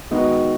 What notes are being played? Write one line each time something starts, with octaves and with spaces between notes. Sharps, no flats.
D#3 G#3 B3 D#4 F#4